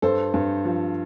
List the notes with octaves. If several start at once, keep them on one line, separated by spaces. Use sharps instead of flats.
G2 A4 C5
G2
F3